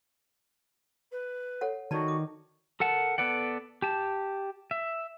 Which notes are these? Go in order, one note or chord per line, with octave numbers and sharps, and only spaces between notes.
B4
A4 C#5 F#5
D#3 D#4 F#4 D5 A5
D6
A4 A#4 F#5 A5
B3 A4 B4 D5 F#5
G4 A5
E5